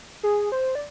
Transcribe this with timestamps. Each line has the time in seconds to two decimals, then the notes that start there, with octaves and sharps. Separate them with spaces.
0.23 G#4
0.52 C5
0.75 D5